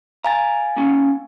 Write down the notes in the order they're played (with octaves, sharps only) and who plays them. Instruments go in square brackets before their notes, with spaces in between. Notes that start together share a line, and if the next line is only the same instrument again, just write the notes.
[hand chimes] F5 G#5 A6 [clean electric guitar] A#5
[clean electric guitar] A#3 C#4